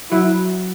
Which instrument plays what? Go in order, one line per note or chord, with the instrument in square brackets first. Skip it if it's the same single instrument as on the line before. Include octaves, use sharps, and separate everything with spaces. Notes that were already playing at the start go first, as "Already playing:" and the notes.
[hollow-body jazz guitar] F#3 [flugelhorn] E4